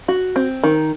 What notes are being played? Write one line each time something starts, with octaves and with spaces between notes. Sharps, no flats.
F#4
C4
D#3